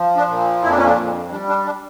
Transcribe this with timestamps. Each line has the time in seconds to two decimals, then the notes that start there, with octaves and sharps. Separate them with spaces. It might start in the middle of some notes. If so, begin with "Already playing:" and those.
Already playing: F3
0.17 D4
0.28 A#2
0.62 F2 E4
0.70 D4
0.77 C#4
0.85 D4
0.96 F2
1.31 G3 D4
1.49 D4
1.65 D4